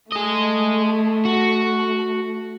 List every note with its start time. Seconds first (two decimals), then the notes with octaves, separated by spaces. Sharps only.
0.12 A3 G#4 D#5
1.25 F#4